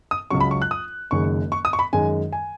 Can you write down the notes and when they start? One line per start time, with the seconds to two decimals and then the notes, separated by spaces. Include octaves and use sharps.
0.11 D#6
0.30 C#2 C#3 F#3 C#6
0.40 B5
0.51 C#6
0.62 F#6
0.71 D#6
1.11 F#1 F#2 D#3 G#3 C#6
1.52 C#6
1.65 D#6
1.73 C#6
1.79 B5
1.93 F#2 D#3 G#3 G#5
2.33 G#5